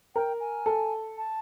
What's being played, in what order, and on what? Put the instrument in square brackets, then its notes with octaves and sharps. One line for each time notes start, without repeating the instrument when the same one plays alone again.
[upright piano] A#4 [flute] G5
[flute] G#5
[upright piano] A4
[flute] A5